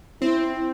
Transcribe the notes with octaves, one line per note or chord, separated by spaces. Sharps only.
C4 E4